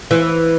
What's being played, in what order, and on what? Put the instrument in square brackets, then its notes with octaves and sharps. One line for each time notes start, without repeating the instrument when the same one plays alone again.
[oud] E3